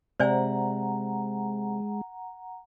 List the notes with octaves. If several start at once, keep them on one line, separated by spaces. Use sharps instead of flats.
C3 G#3 C5 D5 F#5 G#5 A#5